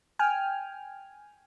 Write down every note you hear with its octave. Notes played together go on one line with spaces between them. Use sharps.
G5 G#5 F6